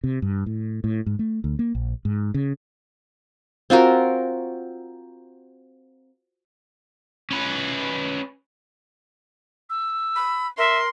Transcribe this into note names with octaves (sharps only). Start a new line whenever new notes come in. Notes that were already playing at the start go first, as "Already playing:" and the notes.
C3
G2
A2
A2
G#2
A3
D2
A#3
A#1
G#2
C#3
C4 F4 F#4 A#4
C#4 B4
E6
B5
A#4 E5 C6